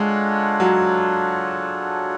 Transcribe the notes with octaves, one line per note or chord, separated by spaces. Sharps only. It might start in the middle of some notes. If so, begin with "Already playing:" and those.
Already playing: G#3 D4 F4 A4 C#5 F#5
F#3